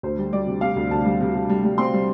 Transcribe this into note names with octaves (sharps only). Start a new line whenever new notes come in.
D2 C5
G3
G3 D5
C3
C3 F5
D2
D2 A5
G3
C3
C3
G3
G3
C4 C6
G3